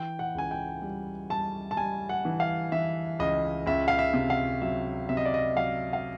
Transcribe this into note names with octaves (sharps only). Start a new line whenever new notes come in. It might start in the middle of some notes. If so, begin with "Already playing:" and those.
Already playing: E3 G5
F#5
C#2 G#5
G5
G3
G3 A5
A5
G3 G#5
F#5
E3
F5
E3 E5
C#2 D#5
C#2 E5
F5
E5
C3
F5
F#3 E5
C3 E5
D#5
D5
D#5
F#3 F5
F5